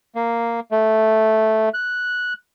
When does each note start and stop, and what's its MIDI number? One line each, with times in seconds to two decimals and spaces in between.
0.15 0.60 58
0.72 1.69 57
1.74 2.33 90